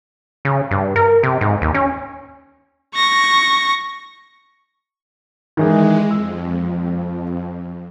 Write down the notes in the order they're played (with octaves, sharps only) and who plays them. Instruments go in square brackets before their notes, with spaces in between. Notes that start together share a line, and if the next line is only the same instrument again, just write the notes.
[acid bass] C#3
G2
A#4
C3
G#2
D#2
C#4
[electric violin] C#6 A#6
[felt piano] D#3 E3 G#4 [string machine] G#3
[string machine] F2 [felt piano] E6